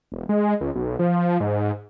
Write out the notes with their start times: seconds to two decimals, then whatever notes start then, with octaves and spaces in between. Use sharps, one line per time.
0.12 E1
0.29 G#3
0.61 C#2
0.75 B1
0.99 F3
1.40 G#2